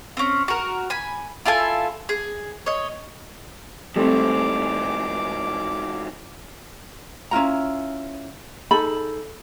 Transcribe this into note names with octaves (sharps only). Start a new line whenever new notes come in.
C4 C#4
F#4 A#4
G#5 B5
E4 F4 A4 G#5
G#4
C#5 D#5
G#2 E3 G3 A3 C4 D6
C#4 E4 F4 A#5
D#4 G#4 A4 B5